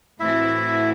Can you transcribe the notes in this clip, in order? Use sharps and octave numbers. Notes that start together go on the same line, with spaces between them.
A2 E3 A3 C4 E4 F#4 E5